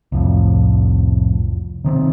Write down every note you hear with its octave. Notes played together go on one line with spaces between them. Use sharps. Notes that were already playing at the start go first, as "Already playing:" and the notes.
C2 F2 A2
C3 D#3 C4